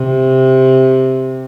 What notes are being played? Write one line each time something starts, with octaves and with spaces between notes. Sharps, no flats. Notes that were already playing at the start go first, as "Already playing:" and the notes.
Already playing: C3